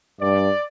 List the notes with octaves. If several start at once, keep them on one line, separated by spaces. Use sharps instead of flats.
G2 D5